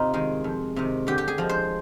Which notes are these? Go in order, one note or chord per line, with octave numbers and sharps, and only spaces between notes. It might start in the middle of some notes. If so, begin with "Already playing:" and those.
Already playing: C3 D#4 F4
D#3 G#3
F2
C3 D#3
D3 G4
G4
G#4
F3 G#3
C5